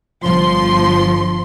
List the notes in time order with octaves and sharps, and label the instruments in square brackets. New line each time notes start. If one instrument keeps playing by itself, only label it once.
[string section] G1 F3 C6